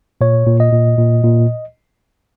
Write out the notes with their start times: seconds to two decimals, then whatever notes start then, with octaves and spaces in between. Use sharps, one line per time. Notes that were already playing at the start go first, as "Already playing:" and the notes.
0.21 A#2 C#5
0.46 A#2
0.60 D#5
0.73 A#2
0.98 A#2
1.24 A#2